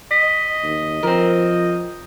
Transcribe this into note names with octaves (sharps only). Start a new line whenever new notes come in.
D#5 B6
D#2
F3 C4 A#4